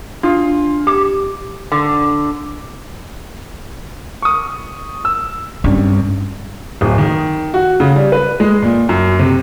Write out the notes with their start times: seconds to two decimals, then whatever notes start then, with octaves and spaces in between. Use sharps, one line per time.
0.23 D4 F4 C6
0.87 G4 D6
1.72 D3
4.22 C#6 D#6
5.05 E6
5.64 C2 G2 C#4
6.81 D1
6.98 D#3
7.54 F#4
7.80 C#3
7.96 G3
8.12 B4
8.40 G#3
8.62 A#2
8.89 F#2
9.19 C3